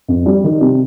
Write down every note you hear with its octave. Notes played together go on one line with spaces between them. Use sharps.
F2
G3
D#3
C3